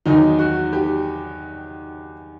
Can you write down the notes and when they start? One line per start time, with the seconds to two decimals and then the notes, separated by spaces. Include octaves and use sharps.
0.06 E2 D#3 F#3 D#4
0.39 F#4
0.73 G4